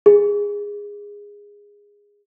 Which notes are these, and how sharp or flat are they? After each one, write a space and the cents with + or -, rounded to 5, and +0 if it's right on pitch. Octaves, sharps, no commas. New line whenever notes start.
G#4 -15